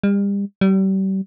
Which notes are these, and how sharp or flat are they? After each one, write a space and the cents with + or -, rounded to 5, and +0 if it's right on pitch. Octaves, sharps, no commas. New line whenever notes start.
G3 +35
G3 -35